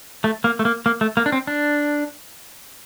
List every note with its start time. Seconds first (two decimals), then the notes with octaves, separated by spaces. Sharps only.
0.24 A3
0.44 A#3
0.59 A3
0.65 A#3
0.86 A#3
1.01 A3
1.17 A#3
1.26 D4
1.32 C4
1.47 D4